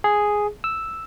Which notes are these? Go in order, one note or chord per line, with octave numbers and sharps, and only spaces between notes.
G#4
E6